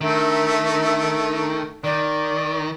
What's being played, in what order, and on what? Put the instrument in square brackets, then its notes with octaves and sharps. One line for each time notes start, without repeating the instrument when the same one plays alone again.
[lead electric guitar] D#3 [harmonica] A3 [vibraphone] D4 A4 A#4 [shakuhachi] E5
[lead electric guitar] D#3 [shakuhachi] D5 [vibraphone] D6